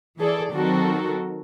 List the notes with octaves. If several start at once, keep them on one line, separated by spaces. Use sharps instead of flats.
E3 G#4 A4 D5
D#3 F#3 C4 F#4 A4 A#4